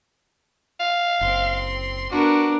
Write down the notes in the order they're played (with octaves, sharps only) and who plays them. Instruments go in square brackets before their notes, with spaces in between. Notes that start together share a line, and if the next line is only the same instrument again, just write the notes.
[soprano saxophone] F5
[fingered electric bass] F#1 [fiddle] C4 C6
[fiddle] B3 A#4 [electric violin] D4 [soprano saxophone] F#4